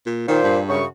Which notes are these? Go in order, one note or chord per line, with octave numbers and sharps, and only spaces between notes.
A#2
A#2 D#3 C5
G2
F#2 C#3 C#6